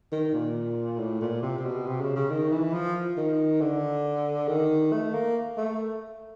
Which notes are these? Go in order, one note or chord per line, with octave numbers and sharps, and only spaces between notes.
D#3
A#2
A2
A#2
C3
C3
B2
C3
C#3
C#3
D#3
E3
F3
D#3
D3
D#3
A3
A#3
A3